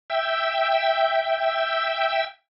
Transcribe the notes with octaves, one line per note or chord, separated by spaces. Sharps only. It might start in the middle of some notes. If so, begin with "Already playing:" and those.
E5 G5